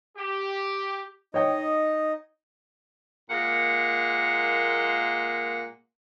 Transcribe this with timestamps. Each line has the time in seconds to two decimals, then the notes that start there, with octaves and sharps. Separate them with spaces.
0.17 G4
1.34 D#4 C#5 D#5 G5
3.30 A#2 G#3 A#3 F#5